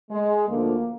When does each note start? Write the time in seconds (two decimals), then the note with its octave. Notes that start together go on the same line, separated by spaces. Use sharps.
0.11 G#3
0.48 D2 D3 F3 A#3